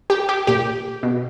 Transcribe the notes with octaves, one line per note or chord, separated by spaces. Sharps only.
G4
G4
A#2 G4
B2